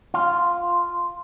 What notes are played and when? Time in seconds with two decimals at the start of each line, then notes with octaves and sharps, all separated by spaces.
0.14 F4